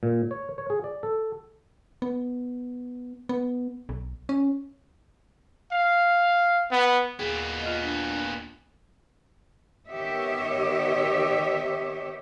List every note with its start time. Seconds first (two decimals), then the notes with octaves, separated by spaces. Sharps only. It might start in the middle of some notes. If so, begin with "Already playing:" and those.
0.03 A#2
0.31 C#5
0.58 C#5
0.70 G#4
0.84 D5
1.03 A4
2.02 B3
3.29 B3
3.89 B1
4.29 C#4
5.72 F5
6.71 B3
7.19 D#2 A#2 B3 G#4
7.62 F4 D#5
7.83 D4
9.89 D#3 B3 G4 C#5 D#5 E5